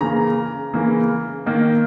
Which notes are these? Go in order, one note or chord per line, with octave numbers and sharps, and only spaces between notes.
C#3 E3 A#3 A#5
C#3 E3 A#3
D#3 A#3